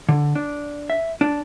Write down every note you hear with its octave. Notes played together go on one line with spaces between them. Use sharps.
D3
D4
E5
D4